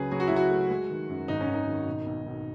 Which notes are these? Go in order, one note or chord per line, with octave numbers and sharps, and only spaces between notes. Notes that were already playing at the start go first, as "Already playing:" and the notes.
Already playing: C#2 C#3 F#3 G#4 B4
F#3 G#4
F#4
E4
F#3
F#4
A3
G#3
D#3
F#2
G#1 D#4
C#4
G#1
D#4
D#3
B1
B1
B1